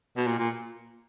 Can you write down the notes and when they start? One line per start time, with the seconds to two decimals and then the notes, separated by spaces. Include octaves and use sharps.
0.17 B2
0.27 A#2
0.39 A#2